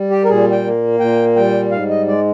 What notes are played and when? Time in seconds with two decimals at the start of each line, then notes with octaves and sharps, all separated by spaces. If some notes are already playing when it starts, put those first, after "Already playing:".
Already playing: G3
0.10 G4
0.25 A#4
0.29 A#2 G#4
0.52 G5
0.64 A#3
1.00 A#2 G5
1.36 G3 G5
1.71 G#2 F5
1.90 D#5
2.07 G#3 D5